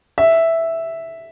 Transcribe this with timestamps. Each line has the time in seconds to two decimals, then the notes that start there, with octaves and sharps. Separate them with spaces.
0.18 E5